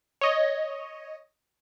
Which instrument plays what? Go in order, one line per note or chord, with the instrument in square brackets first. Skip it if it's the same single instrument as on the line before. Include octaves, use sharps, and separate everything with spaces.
[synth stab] C#5 D#5